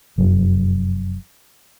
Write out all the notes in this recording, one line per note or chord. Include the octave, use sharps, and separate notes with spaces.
F1 F#2